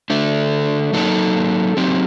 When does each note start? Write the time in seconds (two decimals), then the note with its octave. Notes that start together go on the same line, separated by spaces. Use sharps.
0.10 D3 A3 D4
0.93 F#3 A#3 D#4 A4
1.77 F#3 C4 D#4 G4